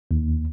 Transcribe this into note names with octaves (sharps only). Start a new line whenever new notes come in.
D#2